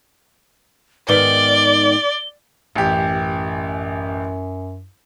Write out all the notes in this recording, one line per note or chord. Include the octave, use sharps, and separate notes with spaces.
G#2 D#3 B3 D5 G7
A1 F#2 G4